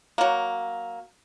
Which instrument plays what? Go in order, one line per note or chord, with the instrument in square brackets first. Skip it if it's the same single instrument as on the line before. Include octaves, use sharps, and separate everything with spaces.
[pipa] F#3 A#3